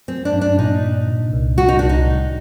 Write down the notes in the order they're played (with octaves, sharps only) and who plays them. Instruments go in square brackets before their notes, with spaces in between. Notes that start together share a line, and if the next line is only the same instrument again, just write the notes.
[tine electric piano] F#3 [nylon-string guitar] C4
[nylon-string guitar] D4
[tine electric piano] G2
[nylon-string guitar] D4
[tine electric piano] A#2 [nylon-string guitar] D#4
[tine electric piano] D4
C3
C2
[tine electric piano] G3 [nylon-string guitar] F#4
[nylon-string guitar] D#4
[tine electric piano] C2 [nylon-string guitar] D4
[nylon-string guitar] D#4
[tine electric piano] A2